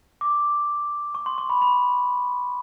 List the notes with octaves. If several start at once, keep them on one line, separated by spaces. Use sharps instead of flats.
D6
C#6
C6
C#6
B5
B5